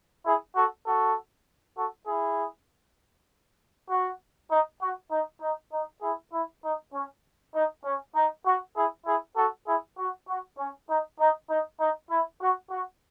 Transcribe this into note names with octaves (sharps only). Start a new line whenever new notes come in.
E4 G#4
F#4 A4
F#4 A4
F#4 A4
E4 G#4
F#4
D#4
F#4
D#4
D#4
D#4
E4 G#4
E4
D#4
C#4
D#4
C#4
D#4
F#4
E4 G#4
E4 G#4
F#4 A4
E4 G#4
F#4
F#4
C#4
D#4
D#4
D#4
D#4
E4
F#4
F#4